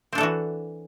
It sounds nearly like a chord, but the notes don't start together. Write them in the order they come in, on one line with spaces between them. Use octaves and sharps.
C4 D4 A4 E3 F#4